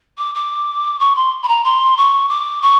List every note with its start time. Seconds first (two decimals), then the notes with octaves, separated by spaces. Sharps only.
0.17 D6
0.34 D6
0.99 C#6
1.15 C6
1.42 B5
1.48 A#5
1.64 C6
1.97 C#6
2.28 D6
2.62 C#6